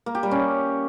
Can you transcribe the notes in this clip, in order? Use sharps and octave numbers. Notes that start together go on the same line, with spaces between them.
A#3
G4
G3
C#4